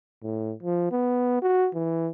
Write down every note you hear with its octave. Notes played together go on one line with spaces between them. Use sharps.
A2
F3
B3
F#4
E3